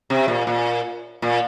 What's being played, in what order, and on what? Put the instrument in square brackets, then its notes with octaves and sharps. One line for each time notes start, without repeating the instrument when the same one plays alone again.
[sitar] C3
A#2
A#2
A#2